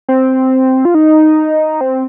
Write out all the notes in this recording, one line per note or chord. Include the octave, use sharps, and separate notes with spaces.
C4
F4
D#4
C4